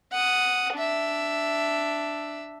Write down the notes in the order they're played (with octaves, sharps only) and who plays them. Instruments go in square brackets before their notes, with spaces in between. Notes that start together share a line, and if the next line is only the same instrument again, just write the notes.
[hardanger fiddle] F#5 D#6
D4 E5